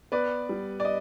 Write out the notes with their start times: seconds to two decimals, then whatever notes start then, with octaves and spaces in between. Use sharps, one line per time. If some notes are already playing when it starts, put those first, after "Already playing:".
0.12 B3 B4 D5
0.49 G3
0.80 D5
0.85 D#5